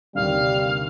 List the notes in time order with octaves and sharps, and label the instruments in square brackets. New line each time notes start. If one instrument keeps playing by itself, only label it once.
[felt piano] G1 D#2 C3 [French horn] G3 [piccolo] F5